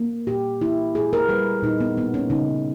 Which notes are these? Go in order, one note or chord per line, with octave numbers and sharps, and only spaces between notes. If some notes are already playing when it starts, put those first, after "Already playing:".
Already playing: A#3
A#2 G4
A#3 E4
A#2 G#4
A#4
G3 A#3 B4
A#2 D#4
B3
G3 A#3 B3
C#4
C#3 D#4